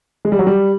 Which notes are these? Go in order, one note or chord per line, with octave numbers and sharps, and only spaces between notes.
G#3
G3
F#3
G3